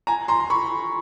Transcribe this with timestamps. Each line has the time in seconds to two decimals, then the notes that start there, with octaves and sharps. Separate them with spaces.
0.07 G#5 A#5
0.28 A#5 C6
0.40 C6
0.50 B5 C#6